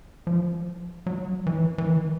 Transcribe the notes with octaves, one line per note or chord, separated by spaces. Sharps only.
F3
F#3
E3
E3
D#3